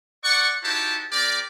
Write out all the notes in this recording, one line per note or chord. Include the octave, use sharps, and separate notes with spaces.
D5 F#5 C#6
D#4 E4 F#4 G4 C5 A5
C4 G4 A#4 D5